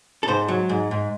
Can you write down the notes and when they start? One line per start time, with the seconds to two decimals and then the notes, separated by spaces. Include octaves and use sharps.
0.23 A4
0.28 G#2 C5
0.48 F#3
0.69 G#2
0.91 G#2